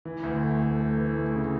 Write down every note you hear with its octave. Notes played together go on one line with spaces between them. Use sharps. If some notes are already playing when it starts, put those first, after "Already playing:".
E3
D2
A3
A3
A3
E3
A3
C#3